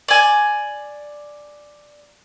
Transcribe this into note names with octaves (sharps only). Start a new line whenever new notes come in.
D5 G#5